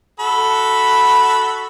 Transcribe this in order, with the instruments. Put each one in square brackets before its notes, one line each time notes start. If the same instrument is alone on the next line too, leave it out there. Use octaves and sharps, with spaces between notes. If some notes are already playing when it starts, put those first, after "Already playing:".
[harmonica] F#4 A4 B5